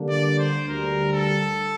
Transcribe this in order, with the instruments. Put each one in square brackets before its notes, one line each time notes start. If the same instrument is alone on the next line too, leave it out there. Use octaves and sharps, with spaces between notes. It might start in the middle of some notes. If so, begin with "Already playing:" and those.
Already playing: [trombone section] D3 G3 A#3 D4
[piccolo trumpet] D5
C5
[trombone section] D2 D3 G3 [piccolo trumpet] A#4
[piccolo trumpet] A4